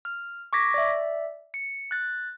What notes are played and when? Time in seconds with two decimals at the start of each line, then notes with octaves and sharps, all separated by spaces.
0.05 F6
0.53 C#6 D6 G#6 A#6 B6
0.74 D5 E5
1.54 C#7
1.91 F#6 A6